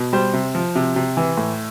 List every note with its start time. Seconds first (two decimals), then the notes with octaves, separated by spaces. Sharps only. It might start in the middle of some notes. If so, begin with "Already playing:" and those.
Already playing: B2
0.13 G3 C5
0.34 C3
0.55 F3
0.76 C3
0.96 C3
1.17 E3
1.37 A2